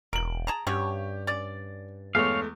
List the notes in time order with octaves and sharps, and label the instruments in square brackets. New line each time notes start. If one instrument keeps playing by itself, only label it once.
[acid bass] E1 [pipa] A#4 [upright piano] D7 F#7
[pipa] G#4 A5 A#5
[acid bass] G2 [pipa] C#4 F#4 C#5 [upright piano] G4
[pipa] C#4 D5 [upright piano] A6
[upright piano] E2 G#3 A3 [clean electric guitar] C#5 F5